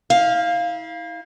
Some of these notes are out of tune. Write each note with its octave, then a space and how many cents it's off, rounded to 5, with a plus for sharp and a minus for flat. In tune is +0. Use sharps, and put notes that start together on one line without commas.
E4 -35 F5 +0